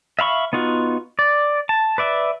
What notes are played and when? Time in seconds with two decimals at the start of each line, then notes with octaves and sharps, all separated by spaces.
0.19 E5 F5 B5 C#6
0.53 B3 D#4 F4 F#4
1.19 D5
1.69 A5
1.98 B4 D5 E5